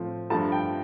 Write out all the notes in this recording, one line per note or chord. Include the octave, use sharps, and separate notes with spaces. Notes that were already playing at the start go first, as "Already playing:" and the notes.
Already playing: A2 F3 C4
G2 F3 A3 A5
G5